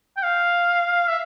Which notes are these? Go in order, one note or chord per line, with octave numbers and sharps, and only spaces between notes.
G5
F5
E5